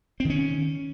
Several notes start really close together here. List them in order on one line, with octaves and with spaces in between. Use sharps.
C4 D#3 C#4